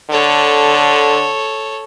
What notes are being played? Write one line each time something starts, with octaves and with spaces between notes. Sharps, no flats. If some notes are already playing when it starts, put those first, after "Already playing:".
D3 A4 C#5